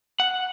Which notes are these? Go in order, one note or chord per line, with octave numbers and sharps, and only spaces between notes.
F#5